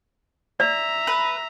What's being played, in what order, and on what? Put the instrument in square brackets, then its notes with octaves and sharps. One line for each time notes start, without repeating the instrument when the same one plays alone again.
[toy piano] D5 [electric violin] E5 A#5
[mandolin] B4